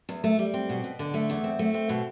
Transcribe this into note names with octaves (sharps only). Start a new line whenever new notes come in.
E2
A3
G3
C4
B2
B2
D3
A3
E2
C4
A3
C4
B2